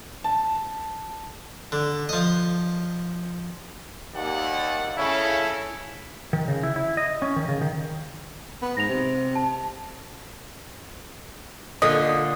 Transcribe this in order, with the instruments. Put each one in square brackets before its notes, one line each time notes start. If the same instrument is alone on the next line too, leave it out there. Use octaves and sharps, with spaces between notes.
[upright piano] A5
[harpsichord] D3
F3 D#5
[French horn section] D#2 [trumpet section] D5 F#5
[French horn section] C#3 [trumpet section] C#4 A4 [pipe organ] E4
[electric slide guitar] D#3
C#3
E4
E4
D#5
C#4
D#3
C#3
D#3
[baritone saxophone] B3
[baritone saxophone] G#2 [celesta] A#6 F7
[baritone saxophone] C3
[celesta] A5
[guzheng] A#2 D3 [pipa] D#5